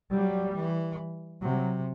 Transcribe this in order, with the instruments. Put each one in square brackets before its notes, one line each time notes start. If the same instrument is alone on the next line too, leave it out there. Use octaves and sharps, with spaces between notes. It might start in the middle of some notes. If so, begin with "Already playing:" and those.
[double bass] F#3 [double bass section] G3
[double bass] E3
[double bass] C3 [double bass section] F#3